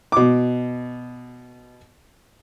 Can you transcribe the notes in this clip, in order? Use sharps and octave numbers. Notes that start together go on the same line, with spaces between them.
B2 D6